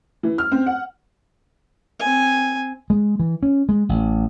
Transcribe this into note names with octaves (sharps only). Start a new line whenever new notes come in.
E3
F6
C4
F#5
C4 G#5
G#3
E3
C#4
G#3
A1